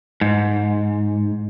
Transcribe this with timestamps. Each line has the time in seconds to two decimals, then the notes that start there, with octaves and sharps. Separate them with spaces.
0.21 G#2